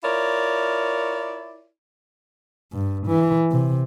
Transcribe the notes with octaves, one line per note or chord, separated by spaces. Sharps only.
E4 F4 A#4 C#5 D5
G2
E3
C3